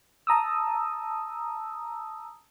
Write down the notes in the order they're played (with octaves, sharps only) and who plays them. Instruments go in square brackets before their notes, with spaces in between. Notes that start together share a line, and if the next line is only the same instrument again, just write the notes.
[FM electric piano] A5 A#5 D#6 E6